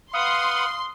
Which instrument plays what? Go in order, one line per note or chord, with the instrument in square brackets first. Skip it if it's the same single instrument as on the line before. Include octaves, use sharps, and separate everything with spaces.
[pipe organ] B4 F#5 B5 [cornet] F5 [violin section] C6 [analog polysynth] D#6